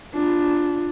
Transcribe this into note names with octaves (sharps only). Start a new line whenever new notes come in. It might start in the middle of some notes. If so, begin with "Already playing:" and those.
D4 F4